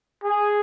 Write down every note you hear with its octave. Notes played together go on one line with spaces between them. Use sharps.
G#4